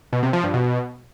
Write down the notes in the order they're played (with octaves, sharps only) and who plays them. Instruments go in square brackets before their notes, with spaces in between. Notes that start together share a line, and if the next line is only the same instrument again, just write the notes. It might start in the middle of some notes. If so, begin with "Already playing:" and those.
[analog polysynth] B2
C3
F3
G2
B2